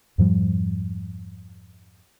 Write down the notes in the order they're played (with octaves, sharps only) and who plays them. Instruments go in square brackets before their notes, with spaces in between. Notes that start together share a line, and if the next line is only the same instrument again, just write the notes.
[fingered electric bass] F2 G#2 F3 G3